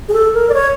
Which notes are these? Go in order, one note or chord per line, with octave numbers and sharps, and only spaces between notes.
G#4
A4
A#4
D5
C#5